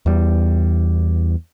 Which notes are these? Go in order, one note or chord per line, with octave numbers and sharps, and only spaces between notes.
E2 G3